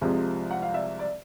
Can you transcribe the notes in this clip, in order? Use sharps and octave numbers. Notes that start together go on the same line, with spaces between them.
C2 C3 F3 G#3
F#5
F5
D5 E5
D5